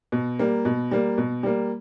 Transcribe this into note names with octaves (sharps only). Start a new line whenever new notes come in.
B2
G3 A#3
B2
G3 A#3
B2
G3 A#3